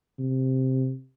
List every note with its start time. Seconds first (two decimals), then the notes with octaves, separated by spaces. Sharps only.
0.19 C3